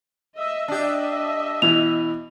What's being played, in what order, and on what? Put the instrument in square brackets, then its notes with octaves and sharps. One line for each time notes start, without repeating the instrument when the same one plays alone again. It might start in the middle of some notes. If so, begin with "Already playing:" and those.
[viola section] D#5 E5
[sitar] D4 G4 [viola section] D#5 E5
[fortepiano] B2 E3 [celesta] F7